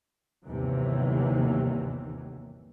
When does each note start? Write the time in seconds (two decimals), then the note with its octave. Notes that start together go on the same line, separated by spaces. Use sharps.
0.46 G1 D#2 C3 D#3 E3 F#3